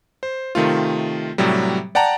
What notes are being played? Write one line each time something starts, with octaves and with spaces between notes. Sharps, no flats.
C5
C3 D#3 A3 F4
A2 C3 F#3 G3
D5 F#5 G5 A5 A#5